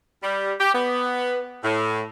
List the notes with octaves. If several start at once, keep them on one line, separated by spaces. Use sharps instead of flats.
G3
G4
B3
A2